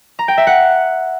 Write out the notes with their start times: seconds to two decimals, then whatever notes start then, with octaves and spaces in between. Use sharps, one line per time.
0.19 A#5
0.28 G5
0.37 E5
0.47 F#5